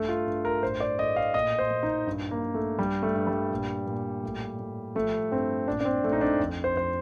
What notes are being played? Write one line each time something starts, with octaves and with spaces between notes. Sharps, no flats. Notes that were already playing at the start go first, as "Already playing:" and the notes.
Already playing: G2 A3
F4
G2
A#4
A2 C5
D5
A2 D#5
F5
A#2 D#5
C5
A#2
D#4
G2
A#3
G2
A3
G2 G3
A3
G2
G3
A#2
A#2
A2
A2
F3 A3
G2 C4
A#2 D4
D4
C4
A#2 A3
D#4
D4
F2
C5
F2 C5